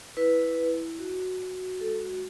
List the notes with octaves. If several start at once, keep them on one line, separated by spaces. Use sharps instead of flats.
E4 B4
E4
F#4
F#4
G#3 A4
F#4